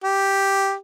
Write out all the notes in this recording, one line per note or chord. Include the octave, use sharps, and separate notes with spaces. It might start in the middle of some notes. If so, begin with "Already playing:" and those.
G4